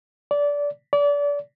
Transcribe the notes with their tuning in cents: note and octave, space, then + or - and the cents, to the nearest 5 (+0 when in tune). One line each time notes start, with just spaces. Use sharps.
D5 -20
D5 -30